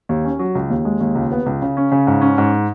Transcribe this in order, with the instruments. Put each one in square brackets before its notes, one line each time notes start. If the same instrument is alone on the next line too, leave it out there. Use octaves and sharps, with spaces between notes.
[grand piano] D#2
C#4
F#3
C#2
D#2
G#3
D#2
C#2
B3
C#2
C#3
C#4
C#3
G#2
C#4
G#2